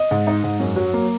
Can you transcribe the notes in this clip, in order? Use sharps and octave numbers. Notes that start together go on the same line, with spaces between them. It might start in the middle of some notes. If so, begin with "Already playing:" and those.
Already playing: D#5
G#2
D#4
G#2
F#2
F#3
A#3